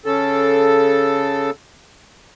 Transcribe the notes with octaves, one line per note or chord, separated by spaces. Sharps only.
C#3 A4